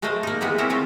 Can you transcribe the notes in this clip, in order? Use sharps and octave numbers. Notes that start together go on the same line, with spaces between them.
G#3 A3 A#4 C5 D#5 F5
A#3 D#4
D#3 E3 G3 G#3 B3
C4 E4 G4 A#4 C5 C#5
A3 C#4 F4